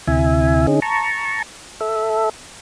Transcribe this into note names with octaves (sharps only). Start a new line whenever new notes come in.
D2 C3 E4 E5 G#5
D3 C#4 D#4 G#4
A5 A#5 C#6
A4 E5